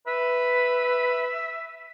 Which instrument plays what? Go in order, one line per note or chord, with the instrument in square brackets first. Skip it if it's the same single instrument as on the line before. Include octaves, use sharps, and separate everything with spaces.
[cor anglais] B4 [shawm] E5